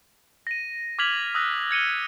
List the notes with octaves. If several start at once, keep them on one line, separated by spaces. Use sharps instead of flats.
A#6 D#7
D6 F6 G#6 B6 F7 F#7
D#6 E6 F#6 A#6
G#6 C#7 D#7 G7